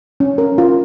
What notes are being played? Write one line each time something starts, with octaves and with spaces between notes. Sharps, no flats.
C#4
A#4
F4